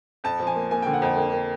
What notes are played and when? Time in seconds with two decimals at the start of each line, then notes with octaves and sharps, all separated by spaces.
0.24 F2 A5
0.40 F3
0.47 G#5
0.56 A#3
0.71 A#3 G#5
0.82 D3 G5
0.93 F#5
1.02 F2 G5
1.17 A#3
1.33 A#3